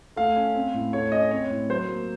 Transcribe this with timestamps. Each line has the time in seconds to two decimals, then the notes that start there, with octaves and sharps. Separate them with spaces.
0.16 A3 F5
0.36 C#4
0.55 C4
0.74 A2
0.93 A3 C#5
1.12 C#4 D#5
1.31 C4 C#5
1.50 A2
1.70 F#3 C5
1.88 A#3